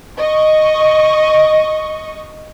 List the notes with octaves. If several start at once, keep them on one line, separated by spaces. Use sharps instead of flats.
D#5 C#6